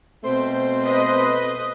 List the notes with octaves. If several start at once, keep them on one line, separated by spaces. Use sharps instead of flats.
B2 A3 C4 C5
B4 D#5